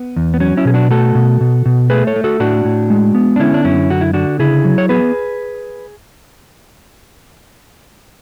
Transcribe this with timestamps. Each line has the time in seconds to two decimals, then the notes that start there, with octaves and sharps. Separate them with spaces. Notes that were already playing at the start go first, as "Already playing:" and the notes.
Already playing: B3
0.16 E2
0.34 B3
0.40 F#3 C#4
0.57 C#4 E4
0.65 B2 G#4
0.74 D4 F#4
0.91 A3 F#4 A4
1.15 B2
1.41 B2
1.66 B2
1.90 A3 G#4 B4
2.07 A4 C#5
2.16 A3
2.24 F#4 A4
2.40 A2 D4 F#4
2.65 A2
2.90 G#3
3.15 B3
3.36 D4
3.39 D3 C#4 E4
3.54 D4
3.64 F#2 C#4 E4
3.90 D3 F#4
4.01 E4
4.13 D3 D4 F#4
4.39 C#3 E4 G#4
4.64 F#3
4.78 C#5
4.89 B3 G#4 B4